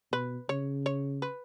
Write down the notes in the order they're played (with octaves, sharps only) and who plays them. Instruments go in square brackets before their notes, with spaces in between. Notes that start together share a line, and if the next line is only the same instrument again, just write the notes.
[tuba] B2 [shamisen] B4
[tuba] C#3 [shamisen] C#5
[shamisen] C#5
B4